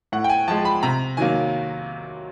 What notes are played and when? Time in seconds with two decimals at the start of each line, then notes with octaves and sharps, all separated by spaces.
0.12 A2 F#5
0.24 G5
0.30 G#5
0.48 F3 G#3 A5
0.65 B5
0.83 C3 A#5
1.17 D#3 F#3 A#3 G#5